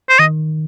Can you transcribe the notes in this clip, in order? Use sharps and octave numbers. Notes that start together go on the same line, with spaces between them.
C5
D#3 D#5